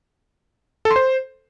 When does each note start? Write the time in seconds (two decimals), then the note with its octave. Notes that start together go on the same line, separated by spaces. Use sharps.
0.85 A4
0.91 C6
0.96 C5